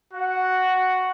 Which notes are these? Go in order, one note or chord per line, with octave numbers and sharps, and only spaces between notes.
F#4 F#5